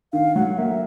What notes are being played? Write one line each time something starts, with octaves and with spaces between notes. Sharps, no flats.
D#3 F5
F#3 F#5
A#3 E5